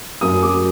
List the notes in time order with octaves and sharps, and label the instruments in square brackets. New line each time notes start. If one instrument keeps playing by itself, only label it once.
[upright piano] F#2 D#6
F#3 D6